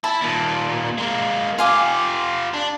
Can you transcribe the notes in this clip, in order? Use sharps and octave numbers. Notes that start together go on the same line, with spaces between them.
E4 A5
D#2 A#2
G#3 A#3
F4 G4 F5 G#5 D6
D4